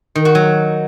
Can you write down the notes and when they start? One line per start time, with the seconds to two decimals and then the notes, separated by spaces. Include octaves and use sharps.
0.15 D#3
0.25 F#4
0.35 F#3